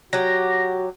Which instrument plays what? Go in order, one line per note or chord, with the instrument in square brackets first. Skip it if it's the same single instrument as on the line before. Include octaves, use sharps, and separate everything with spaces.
[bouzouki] F#3 G4 [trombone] F#4 [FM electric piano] A#6